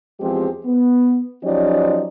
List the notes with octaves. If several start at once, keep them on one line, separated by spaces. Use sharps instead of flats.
E2 F3 G#3 C4 G4 G#4
B3
F3 F#3 C#4 D#4 G4 D5